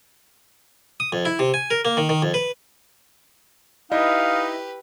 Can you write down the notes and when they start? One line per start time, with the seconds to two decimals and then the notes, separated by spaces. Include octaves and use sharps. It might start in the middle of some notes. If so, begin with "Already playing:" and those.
1.00 D#6
1.13 F2
1.25 E4
1.39 C3
1.54 G#5
1.70 A#4
1.85 A#3
1.97 D#3
2.09 D#3
2.22 F2
2.34 B4
3.92 D#4 E4 G4 B4 D#5 F5